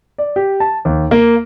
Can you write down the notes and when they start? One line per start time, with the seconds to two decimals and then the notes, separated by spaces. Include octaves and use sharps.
0.18 D5
0.36 G4
0.60 A5
0.85 D#2
1.11 A#3